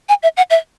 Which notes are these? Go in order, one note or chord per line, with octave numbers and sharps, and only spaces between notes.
G#5
E5
F#5
E5